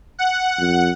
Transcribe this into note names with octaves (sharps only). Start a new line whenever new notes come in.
F#5
F2